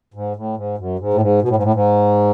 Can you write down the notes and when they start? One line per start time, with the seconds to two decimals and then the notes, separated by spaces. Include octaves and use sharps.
0.14 G#2
0.36 A2
0.57 G#2
0.78 F#2
0.99 G#2
1.14 A2
1.21 G#2
1.42 B2
1.48 A2
1.56 G#2
1.63 A2
1.74 G#2